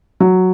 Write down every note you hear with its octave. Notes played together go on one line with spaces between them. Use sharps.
F#3